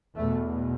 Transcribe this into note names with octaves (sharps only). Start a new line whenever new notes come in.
E2 B2 A3